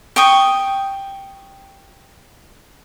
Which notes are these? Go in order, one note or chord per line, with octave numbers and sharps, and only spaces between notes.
G5 C#6 D#6